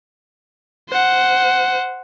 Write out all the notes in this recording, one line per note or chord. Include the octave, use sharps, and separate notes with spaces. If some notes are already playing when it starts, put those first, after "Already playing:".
C5 F#5